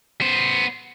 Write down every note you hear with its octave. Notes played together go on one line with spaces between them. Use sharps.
B3 C5